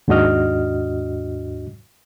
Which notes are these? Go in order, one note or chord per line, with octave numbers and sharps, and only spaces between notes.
D#2 G#2 D4 F#4 D#5 F6